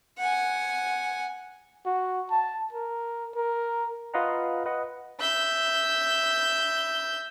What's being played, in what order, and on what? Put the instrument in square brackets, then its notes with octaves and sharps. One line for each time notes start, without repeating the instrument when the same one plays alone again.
[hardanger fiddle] F#5 G#5
[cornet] F#4
A5
A#4
A#4
[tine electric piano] F4 B4 D#5 F5 F#5 A#5
B4 D#5 F#5
[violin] E5 G6